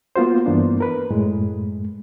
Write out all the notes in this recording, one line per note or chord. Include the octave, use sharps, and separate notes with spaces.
A#3 B3 F4 F#4 C5
G2 E3 A#3 B3 D4
A#4 B4
F#2 A2 G#3